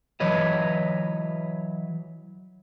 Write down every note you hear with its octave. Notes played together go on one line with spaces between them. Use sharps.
E3 F#3 B4 C#5 D#5